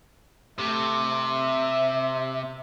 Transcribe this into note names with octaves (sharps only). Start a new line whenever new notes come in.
C3 A3
E5